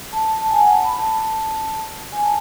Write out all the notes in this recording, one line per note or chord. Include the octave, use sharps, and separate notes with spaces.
A5
A5
G#5
F#5
A5
B5
A5
G#5
A5